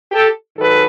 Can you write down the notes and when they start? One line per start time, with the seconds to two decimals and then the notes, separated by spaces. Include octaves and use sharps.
0.12 G4 A4
0.57 G#2 D#3 F#3 A4 B4